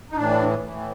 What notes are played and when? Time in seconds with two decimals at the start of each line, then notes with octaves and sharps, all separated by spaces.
0.11 D#4
0.16 A2 E3 D4
0.64 A2 E3